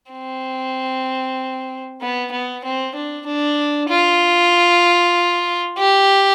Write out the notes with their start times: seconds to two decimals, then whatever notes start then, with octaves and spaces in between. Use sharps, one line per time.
0.12 C4
2.01 B3
2.32 B3
2.64 C4
2.95 D4
3.26 D4
3.89 F4
5.79 G4